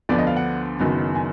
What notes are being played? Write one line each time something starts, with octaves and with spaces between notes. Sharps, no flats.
D2 D3 F3 B3 D4 D5
D#5
F5
F#5
F#1 F#2 D#3 F#3 B3
G#5